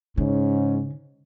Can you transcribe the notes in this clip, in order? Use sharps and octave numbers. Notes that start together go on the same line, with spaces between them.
G#2 C#3 C#4